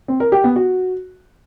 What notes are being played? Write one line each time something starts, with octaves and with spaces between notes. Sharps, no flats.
C4
A#4
G4
B3
F#4